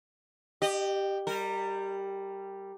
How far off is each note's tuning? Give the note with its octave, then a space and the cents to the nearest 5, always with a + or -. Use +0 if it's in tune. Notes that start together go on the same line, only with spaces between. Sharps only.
G4 +0 D#5 -35
G3 +0 A#4 -25